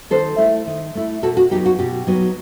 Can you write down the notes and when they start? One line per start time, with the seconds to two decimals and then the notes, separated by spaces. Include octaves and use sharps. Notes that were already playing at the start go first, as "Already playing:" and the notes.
0.10 D#3 A4 C5
0.38 A3 E4
0.67 D#3
0.95 A3 E4
1.23 B2 F#4 A4
1.37 F#4
1.51 F#3 B3 D#4 G4
1.66 F#4
1.79 B2 G4
2.07 F#3 B3 D#4